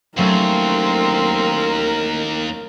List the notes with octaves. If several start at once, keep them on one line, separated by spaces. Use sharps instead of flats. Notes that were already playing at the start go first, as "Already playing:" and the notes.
D#2 F#3 A3 C4 C#4 A#4